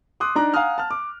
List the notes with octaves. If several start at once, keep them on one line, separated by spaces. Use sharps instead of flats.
C6 D6 D#6 F#6
D4 D#4 A#5 D6 F#6
F5 F#5 G#5 A#5 D#6 F6
A5 F6
D6